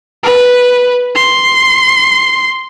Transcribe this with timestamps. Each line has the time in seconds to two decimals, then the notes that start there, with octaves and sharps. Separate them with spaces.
0.23 B4
1.15 C6